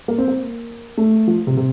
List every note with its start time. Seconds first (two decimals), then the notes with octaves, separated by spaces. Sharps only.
0.08 A#3
0.18 C4
0.28 A#3
0.97 A3
1.27 F3
1.47 C3
1.57 C3